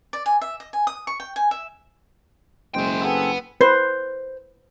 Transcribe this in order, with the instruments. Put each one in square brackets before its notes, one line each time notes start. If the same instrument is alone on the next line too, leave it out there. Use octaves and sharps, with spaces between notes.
[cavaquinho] D5
G#5
E5
D#5
G#5
D#6
C#6
G5
G#5
E5
[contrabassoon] F#1 [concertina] G#3 C5 [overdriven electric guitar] E4 G5
[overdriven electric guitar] B3 [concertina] C4 G#4 A4
[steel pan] B4 [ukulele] C5